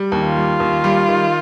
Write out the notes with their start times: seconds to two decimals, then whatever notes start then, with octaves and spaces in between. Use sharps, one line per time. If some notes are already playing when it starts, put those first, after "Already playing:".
Already playing: G3
0.12 D#2
0.25 F4
0.36 G3
0.60 D#2
0.84 G3
1.08 D#3